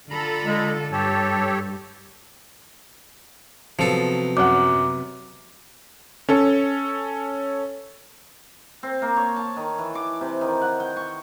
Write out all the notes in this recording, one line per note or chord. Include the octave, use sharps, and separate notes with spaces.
D3 F4 A4 A#5 B5
G#3
G2 G4 A4 C#5 A5
C3 F3 F#3 B3 A4
F#2 F#5 D6
C#4 A4
C4
A#3
C#5
A5
D#3
E3
D6
C3
D#3
F#5
G5
C#6